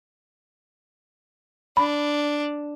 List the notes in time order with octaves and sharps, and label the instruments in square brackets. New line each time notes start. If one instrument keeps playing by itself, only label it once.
[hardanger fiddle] D4 [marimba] B5